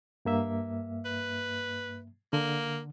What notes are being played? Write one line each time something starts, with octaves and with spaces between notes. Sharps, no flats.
G2 A#3 E5
B4
D3 A#3